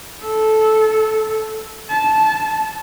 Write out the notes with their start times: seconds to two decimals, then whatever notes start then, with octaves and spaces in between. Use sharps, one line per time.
0.22 A4
1.89 A5